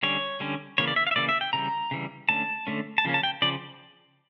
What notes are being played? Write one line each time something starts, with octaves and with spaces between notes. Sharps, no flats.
D3 G3 C#4 C#5
D3 G3 C#4
C#3 E3 A#3 C#5
D5
E5
F5
E5
C#3 E3 A#3 D5
E5
G5
C#3 E3 G3 A#5
C#3 E3 G3
D3 A3 C#4 A5
D3 A3 C#4
A5
C#3 F3 A#3 C#4
A5
G5
C#3 F3 D5